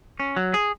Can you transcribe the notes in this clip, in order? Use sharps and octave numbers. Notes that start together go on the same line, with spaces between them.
C#4
F#3
G#4